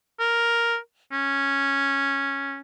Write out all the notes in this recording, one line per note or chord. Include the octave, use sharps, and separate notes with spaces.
A#4
C#4